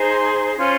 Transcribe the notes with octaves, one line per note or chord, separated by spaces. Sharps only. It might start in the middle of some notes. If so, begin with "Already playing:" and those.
Already playing: D#4 G#4 C5
C6
C#4 F4 C5 C6